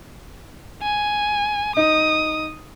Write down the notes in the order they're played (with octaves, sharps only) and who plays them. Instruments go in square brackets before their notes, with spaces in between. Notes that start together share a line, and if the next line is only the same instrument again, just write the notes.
[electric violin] G#5
[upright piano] D#4 [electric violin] D#6